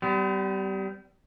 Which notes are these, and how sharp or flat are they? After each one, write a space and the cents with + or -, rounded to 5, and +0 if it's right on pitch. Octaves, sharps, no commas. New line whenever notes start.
G3 -20 B3 +45